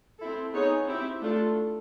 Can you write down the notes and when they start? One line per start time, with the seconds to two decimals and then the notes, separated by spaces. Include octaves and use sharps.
0.19 C4 E4 A4
0.53 B3 D#4 G#4 C#5
0.87 C4 E4 G4
1.22 A3 D4 F4 A4